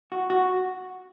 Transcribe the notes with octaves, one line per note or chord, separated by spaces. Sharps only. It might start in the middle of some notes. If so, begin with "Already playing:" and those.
F#4
F#4